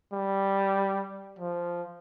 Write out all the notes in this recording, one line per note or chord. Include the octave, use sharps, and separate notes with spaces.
G3
F3